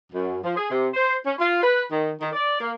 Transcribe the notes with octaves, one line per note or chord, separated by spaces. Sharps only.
F#2
F3
G#4
C3
C5
C#4
F4
B4
D#3
D#3
D5
A#3